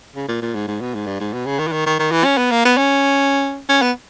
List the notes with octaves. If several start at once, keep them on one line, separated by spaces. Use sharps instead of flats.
C#3
A#2
A#2
G#2
G#2
B2
G#2
G2
G#2
B2
C#3
D#3
E3
D#3
D#3
D#3
E3
C#4
B3
A#3
B3
C#4
C#4
B3